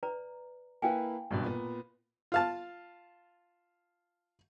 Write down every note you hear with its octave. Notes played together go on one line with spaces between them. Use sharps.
B4 D5 A#5
A#3 E4 B4 F5 G5 G#5
G#1 G2 B2
A#2 B3
F4 F5 A5